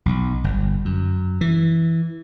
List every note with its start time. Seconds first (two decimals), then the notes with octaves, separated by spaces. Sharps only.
0.06 B1
0.44 G1
0.85 F#2
1.41 E3